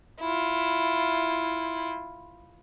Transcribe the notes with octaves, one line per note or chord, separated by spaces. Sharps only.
E4 F4